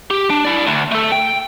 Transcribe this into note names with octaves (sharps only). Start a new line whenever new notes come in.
G4
D4
E4 D5
D2
A3 A4
G5